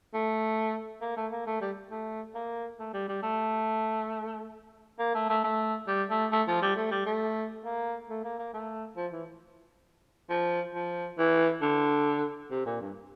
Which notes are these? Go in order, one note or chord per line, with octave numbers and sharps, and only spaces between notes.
A3
A#3
A3
A#3
A3
G3
A3
A#3
A3
G3
G3
A3
A#3
A3
A3
A3
G3
A3
A3
F3
G3
A3
G3
A3
A#3
A3
A#3
A#3
A3
F3
E3
F3
F3
E3
D3
C3
A#2
G2